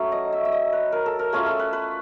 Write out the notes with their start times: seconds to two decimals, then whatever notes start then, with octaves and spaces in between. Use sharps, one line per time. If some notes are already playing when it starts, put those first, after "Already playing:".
Already playing: F#3 A3 C#4
0.12 D#5
0.32 E5
0.45 E5
0.52 D#5
0.73 B4
0.92 A#4
1.06 A4
1.19 A#4
1.33 A3 C#4 F4 G#4
1.46 A4
1.59 B4
1.73 B4